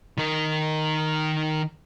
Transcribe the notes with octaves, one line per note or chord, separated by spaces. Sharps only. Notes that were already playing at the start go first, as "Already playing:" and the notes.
D#3 A#4